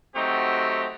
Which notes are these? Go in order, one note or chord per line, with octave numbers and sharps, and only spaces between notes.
F#3 A3 C4 D#4 F#4 G4